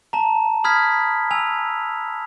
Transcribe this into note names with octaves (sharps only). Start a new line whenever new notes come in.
A5 A#5
B5 D#6 F6 G#6 B6
G#5 E6 F7